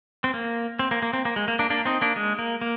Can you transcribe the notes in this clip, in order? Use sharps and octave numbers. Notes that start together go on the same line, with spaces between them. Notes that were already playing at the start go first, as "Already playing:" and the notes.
C4
A#3
C4
A#3
A#3
C4
A#3
G#3
A#3
A#3 D4
A#3 D4
C4 D#4
A#3 D4
G#3
A#3
A#3